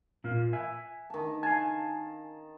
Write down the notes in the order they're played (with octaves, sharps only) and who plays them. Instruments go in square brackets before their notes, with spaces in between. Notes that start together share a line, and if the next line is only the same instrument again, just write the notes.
[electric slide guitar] A#2 A#3
E5 G#5
[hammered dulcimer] D#3 A5
[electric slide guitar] F5 G#5 [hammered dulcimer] A5